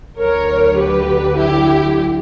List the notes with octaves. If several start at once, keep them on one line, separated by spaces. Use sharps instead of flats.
D2 D3 F#3 A#4 C#5
G4 B4
E4 G4